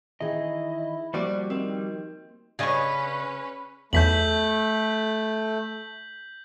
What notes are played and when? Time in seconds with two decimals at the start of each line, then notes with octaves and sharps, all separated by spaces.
0.21 D#3 E3 E4 G#4 D#5
1.14 F3 G3 A#3 F#4 C5 D5
1.50 D#3 C4
2.59 C#3 C#4 G#4 B4 D5 D#5 C#6
3.93 B1 E2 A3 G6 B6 F#7